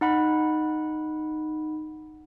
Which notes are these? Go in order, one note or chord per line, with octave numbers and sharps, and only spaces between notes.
D#4 F#5 B5